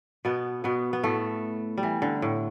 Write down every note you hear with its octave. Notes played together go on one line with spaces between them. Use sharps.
B2 B3
B2 B3
B3
A2 A3
G3
E3
D3
A2